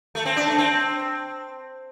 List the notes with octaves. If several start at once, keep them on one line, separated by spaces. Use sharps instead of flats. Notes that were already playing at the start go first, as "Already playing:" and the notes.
A3
C4
D4
A3
C4